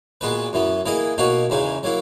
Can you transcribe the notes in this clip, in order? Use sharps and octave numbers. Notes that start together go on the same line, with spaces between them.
A#2 G#3 B3 F#4 B4
F#2 E3 B3
E3 A#3 E4 G#4 D#5
B2 A#3 D#4 F#4 C#5
E2 C#3 E3 G#3 D#4
F#3 A#3 E4